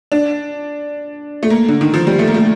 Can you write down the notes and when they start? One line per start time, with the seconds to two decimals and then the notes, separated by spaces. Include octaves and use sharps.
0.12 D4
1.43 A3
1.50 A#3
1.68 D3
1.81 D#3
1.94 F3
2.07 G3
2.19 A3
2.28 A#3
2.34 A3